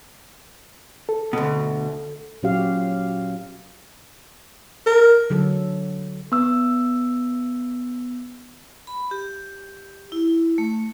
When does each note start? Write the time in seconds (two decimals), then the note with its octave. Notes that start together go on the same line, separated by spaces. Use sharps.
1.09 A4
1.33 D2 B2
2.43 A#2 F#3 C#4 F#4 G4 F5
4.86 A#4
5.30 D3 F#3 A4
6.32 B3 E6
8.87 B5
9.11 G4
10.12 E4
10.58 A3